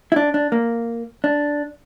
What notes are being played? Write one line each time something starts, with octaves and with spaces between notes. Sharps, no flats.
E4
D4
D4
A#3
D4